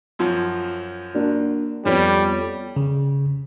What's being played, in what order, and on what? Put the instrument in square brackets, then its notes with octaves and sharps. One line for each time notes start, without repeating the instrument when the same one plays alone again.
[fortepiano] F#2 F3
[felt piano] A#3 D4 F#4
[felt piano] F2 B3 [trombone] G3 [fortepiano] C#4
[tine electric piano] C#3